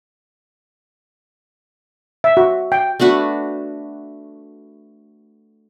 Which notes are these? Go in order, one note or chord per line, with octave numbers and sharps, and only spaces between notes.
E5
F#4
G5
A3 D4 F#4 B4